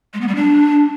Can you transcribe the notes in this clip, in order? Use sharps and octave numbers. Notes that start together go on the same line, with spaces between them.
G#3
B3
G3
D4